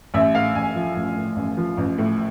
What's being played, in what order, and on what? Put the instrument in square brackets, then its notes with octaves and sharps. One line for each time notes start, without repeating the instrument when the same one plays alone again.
[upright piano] A1 E5
A2 F5
A1 G#5
F3
A1
A2
A1
F3
A1
A2